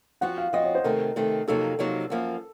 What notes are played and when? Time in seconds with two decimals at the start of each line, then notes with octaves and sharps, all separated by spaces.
0.21 F3 C4 F#4 F#5
0.38 F5
0.53 F3 C4 F#4 D#5
0.64 C#5
0.75 C5
0.84 C3 D#3 A3 C4 A#4
1.16 C3 D#3 A3 C4
1.48 F2 C3 F#3 A#3 D#4 A4
1.79 F2 C3 F#3 A#3 D#4
2.10 F#2 F3 A#3